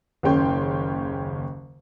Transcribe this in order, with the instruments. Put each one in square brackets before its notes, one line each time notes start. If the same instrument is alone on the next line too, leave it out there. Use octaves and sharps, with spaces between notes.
[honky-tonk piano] F#1 D#2 C#3 C#4 G5 C6